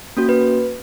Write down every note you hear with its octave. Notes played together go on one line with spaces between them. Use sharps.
A#3 C#4 F#4
B4